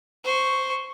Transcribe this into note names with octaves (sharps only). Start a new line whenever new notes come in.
C5 C#6